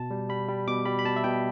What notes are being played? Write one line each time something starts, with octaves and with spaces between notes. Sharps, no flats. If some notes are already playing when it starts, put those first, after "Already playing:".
Already playing: B2 A5
G3
G3 B5
G3
B2 D6
G3 B5
B5
B2 A5
E5
B2 G5